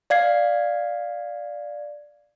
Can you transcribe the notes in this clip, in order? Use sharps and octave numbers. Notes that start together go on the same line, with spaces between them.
D5 F5 G#6 C7